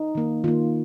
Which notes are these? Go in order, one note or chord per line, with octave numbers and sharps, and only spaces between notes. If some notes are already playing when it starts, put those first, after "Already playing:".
Already playing: D#4
D#3 A#3
D#3 A#3 F4